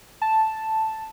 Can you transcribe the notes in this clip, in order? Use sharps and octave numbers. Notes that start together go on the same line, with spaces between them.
A5